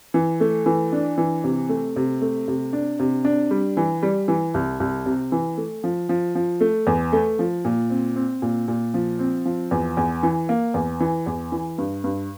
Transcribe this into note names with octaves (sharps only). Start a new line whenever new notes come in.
E3
A3
E3
D4
E3
C3
A3
C3
A3
C3
D4
C3
D4
G3
E3
G3
E3
C2
C2
C3
E3
A3
F3
F3
F3
A3
E2
A3
F3
A#2
C4
C4
A#2
A#2
F3
C4
F3
E2
E2
E3
A#3
E2
E3
E2
E3
G2
G2